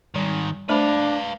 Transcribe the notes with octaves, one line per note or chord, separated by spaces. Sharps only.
G#2 D#3 G3
A3 D4 B4 C5 F5 B5